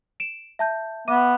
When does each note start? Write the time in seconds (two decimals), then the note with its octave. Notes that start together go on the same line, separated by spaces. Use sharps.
0.20 D7 E7
0.59 E5 A5 G6
1.08 B3 E5 D6 D#7